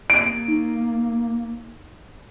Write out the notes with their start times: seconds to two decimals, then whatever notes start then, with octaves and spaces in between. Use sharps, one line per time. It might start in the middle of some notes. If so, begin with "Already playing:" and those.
0.10 A#3 D7
0.48 D#4